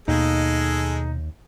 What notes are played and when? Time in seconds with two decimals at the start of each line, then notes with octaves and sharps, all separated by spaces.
0.08 D#2 B2 G#3 A#3 D#4 G#4 A4